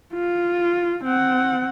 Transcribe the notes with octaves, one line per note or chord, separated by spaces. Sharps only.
F4
C4 F#5